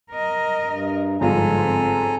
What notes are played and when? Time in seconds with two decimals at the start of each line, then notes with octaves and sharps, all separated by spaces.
0.11 A#4 D#5
0.65 G2
1.21 G1 G#2 F3 G#3 F4 A4 G#5 A#5
1.61 C4